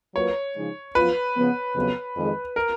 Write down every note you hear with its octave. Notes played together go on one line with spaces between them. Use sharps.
F#3 A#3 F4 B4 C#5
C#3 F3 G#3 D#4
F#2 F3 B3 F4 B4
C#3 F3 B3
F2 C#3 F#3 B3
F2 D#3 G#3
A#4